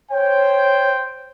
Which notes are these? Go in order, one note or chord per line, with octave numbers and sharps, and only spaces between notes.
C5 C#5 G5